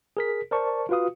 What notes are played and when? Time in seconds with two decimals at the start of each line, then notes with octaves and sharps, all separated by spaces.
0.17 G#4 A#4 B6
0.51 A#4 C5 D5 A5 C#6
0.89 F4 F#4 B4 F5 D#6